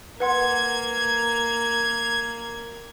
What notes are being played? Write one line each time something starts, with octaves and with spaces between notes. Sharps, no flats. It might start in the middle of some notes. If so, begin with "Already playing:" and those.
A#3 B4 F#5 C6 G#6